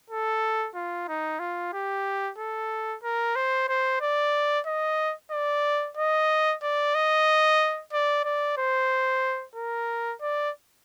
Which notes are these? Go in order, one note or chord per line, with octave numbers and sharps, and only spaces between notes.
A4
F4
D#4
F4
G4
A4
A#4
C5
C5
D5
D#5
D5
D#5
D5
D#5
D5
D5
C5
A#4
D5